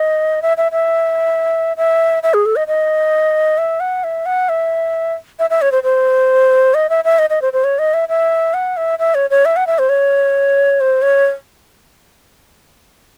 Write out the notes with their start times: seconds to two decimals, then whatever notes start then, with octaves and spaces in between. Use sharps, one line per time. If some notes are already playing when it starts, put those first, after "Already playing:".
Already playing: D#5
0.42 E5
0.57 E5
0.72 E5
1.77 E5
2.23 E5
2.34 G#4
2.46 A4
2.56 D#5
2.68 D#5
3.58 E5
3.80 F#5
4.04 E5
4.26 F#5
4.49 E5
5.39 E5
5.50 E5
5.62 C#5
5.72 C5
5.83 C5
6.74 D#5
6.90 E5
7.04 E5
7.19 D#5
7.30 D#5
7.42 C5
7.53 C5
7.64 C#5
7.79 D#5
7.94 E5
8.09 E5
8.54 F#5
8.77 E5
8.99 E5
9.15 C#5
9.30 C#5
9.45 E5
9.56 F#5
9.67 E5
9.79 C5
9.89 C#5
10.81 C5
11.02 C#5